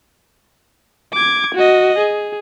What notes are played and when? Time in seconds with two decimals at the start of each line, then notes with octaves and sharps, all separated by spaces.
1.14 D6 G#6
1.55 F#4 D#5
1.98 G#4